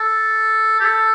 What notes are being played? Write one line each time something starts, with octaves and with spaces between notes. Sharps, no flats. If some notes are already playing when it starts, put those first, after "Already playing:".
Already playing: A4
G4
A4